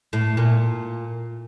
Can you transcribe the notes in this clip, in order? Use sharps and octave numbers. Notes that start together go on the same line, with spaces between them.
A2
A#2